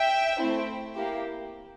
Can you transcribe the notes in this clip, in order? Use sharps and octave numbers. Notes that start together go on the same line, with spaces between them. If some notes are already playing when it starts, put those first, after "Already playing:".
Already playing: E5 G5
A3 C4 E4
A#3 E4 G4